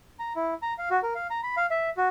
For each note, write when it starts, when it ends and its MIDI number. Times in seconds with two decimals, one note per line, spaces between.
0.19 0.33 82
0.36 0.54 64
0.62 0.74 82
0.78 0.89 77
0.90 1.00 66
1.03 1.13 70
1.15 1.27 77
1.30 1.40 82
1.43 1.56 83
1.57 1.66 77
1.71 1.90 76
1.97 2.08 66